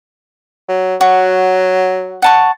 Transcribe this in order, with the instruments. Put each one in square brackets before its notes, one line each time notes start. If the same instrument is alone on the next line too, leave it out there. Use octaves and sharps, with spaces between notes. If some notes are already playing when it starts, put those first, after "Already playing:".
[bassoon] F#3
[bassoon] F#3 [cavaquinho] F#4
[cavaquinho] F#5 A5 C#6